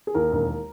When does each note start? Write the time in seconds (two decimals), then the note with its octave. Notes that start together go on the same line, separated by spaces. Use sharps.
0.07 G#4
0.14 D#2 A#4
0.32 E1